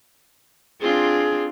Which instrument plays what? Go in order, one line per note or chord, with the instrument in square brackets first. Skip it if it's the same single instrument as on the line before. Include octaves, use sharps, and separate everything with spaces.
[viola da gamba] C4 D4 F4 [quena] G#4